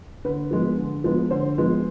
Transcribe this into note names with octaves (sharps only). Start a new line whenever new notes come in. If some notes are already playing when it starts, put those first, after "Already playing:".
D3 B4
F3 G#3 B3
D3
F3 G#3 B3
D3 C5
F3 G#3 B3